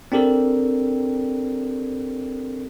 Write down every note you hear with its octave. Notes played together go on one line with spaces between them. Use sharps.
C4 D4 G4 A4 A#4